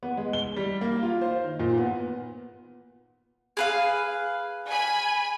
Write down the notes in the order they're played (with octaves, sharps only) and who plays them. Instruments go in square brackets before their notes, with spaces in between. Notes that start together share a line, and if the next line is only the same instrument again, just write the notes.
[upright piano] B3
G#3
G7
G3
A#3
F4
C5
D#3
A#2
B3
[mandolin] G#4 B4 F5
[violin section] G#5 B5